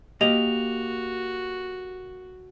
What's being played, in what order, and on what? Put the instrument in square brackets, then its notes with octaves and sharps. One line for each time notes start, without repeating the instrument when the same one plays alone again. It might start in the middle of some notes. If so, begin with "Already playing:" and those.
[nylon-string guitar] A#3 [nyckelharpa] F#4 [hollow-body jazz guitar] G4 D#5 [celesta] F7